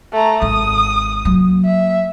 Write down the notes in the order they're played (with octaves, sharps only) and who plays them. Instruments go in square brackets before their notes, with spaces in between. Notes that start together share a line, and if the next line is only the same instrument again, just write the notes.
[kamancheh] A3 A#5
[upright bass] G#1 [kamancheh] D#6
[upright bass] F#3 A#3
[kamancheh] E5